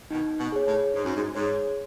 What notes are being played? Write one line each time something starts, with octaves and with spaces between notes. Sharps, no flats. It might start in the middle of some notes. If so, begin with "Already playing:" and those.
B2 D#3 D#4
B2
G#4 C#5
A2
G#2 D#4
F#2
G#2
G#2 G#4 C#5